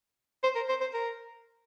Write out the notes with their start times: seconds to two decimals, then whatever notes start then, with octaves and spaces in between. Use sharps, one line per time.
0.43 C5
0.56 A#4
0.69 C5
0.81 C5
0.94 A#4